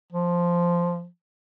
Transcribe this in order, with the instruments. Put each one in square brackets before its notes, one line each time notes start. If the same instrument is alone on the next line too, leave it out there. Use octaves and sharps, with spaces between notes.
[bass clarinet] F3